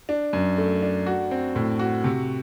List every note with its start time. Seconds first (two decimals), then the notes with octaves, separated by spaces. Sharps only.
0.09 D4
0.33 F#2
0.58 A3
0.82 D4
1.06 F#4
1.31 C4
1.56 A2
1.79 F#4
2.04 C3